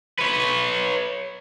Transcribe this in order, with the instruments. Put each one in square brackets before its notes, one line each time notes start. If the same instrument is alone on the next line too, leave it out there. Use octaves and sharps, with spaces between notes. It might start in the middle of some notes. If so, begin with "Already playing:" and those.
[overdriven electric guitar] B4 C#5